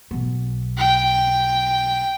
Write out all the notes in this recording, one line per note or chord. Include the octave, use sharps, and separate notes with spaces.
B1 B3
G5